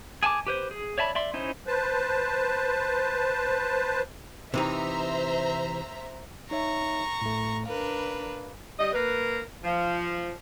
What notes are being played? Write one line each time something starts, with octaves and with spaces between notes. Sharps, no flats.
G#4 G#5 A5 D6
G4 B4 C5
G#4
C#5 D5 E5 A5 B5
D5 E5 C6
C#4 D#4 E4 C5 D#5
B4 C5 A5
C3 E3 D#4 C5 E5 A#5
D#4 C#5 E5 A#5 C#6
A2 A3
D4 A#4 B4 F5
G3 D#5
A#3 A#4 B4
F3